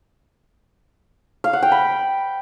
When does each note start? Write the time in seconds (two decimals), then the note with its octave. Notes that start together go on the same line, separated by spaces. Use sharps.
1.44 F5
1.53 F#5
1.63 G5
1.72 B5